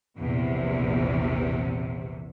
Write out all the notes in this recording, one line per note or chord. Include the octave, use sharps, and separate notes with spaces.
A#1 E2 C3